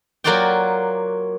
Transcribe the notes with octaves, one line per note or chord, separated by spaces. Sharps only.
F#3 A#3 F4 F#4 D5 G5